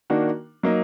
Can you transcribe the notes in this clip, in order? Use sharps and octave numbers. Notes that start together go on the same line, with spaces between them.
D#3 A#3 D4 F#4
F#3 A#3 D#4